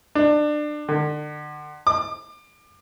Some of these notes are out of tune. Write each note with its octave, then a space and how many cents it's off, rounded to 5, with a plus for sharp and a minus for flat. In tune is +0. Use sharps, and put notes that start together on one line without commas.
D4 +25
D3 +35
D6 +30